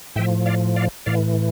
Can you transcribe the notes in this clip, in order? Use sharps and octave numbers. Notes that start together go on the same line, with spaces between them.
A2 F3 E5 G5
D5 F5
D5 F5
A2 E3 D5 F5